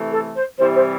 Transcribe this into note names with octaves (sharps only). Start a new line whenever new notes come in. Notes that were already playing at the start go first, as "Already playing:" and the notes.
Already playing: C3 E3 A3
A4
C5
C3 E3 G3 E4 C5
C5